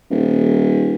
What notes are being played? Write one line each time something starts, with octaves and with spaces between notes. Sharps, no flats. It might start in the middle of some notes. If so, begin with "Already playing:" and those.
D#1